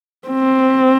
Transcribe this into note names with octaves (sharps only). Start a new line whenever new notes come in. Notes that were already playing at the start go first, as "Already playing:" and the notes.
C4